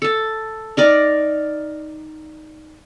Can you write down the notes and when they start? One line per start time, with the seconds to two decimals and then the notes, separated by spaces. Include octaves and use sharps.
0.02 A4 A5
0.77 D#4 A#4 D5